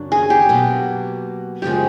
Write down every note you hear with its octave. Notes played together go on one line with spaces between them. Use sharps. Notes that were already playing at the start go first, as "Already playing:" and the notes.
Already playing: F#2 C#3 F#3 D4
G#4
G4
B2 F#3 A#3
F#2 C#3 F3 G#3 G4